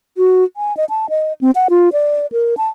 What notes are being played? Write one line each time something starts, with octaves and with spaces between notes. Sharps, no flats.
F#4
G#5
D#5
A5
D#5
C4
F#5
F4
D5
A#4
A5